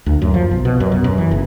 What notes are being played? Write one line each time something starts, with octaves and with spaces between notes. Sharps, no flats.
D2
F#2
F3
B1
B2
F#2
B2
F#2
E3
F#1